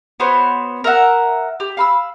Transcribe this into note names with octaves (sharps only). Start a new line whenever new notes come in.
B3 F#4 C5 C#5
A#4 E5 F#5
G4
F5 B5 E6